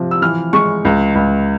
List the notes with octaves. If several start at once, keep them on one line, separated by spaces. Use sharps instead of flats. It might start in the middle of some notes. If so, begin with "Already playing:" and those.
Already playing: C3 F3
E6
E3 F6
G#3 C#6
C#2
C#2